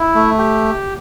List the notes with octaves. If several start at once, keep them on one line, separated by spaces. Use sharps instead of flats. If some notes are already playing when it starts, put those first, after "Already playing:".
Already playing: E4
A3
G4